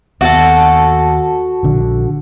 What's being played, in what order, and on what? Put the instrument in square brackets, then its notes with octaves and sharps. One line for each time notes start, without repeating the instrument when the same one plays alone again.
[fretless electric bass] D#2 B3 [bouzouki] F#4 G4 A4
[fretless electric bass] A#1 D3